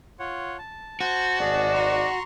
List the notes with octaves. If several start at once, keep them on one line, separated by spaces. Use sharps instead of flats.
F4 C#5 F#5
A5
F#4 C5 A5 G6
G#1 G#4 D5 A5
A#5 C6 C#6